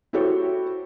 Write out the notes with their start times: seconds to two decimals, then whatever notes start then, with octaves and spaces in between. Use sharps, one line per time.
0.13 E4 F#4 G4 A4 C5 C#5